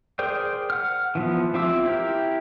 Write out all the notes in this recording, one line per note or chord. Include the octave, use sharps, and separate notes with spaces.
G#4 A#4 C5 D5 G5
F#5 F6
E3 F3 B3
C4 F4 E5 D6 E6
E4 G4 A#4